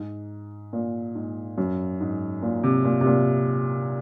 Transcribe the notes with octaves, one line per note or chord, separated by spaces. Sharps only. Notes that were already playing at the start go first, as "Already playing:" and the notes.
Already playing: G#2
A#2
G#2
F#2
G#2
A#2
C3
A#2
C3
A#2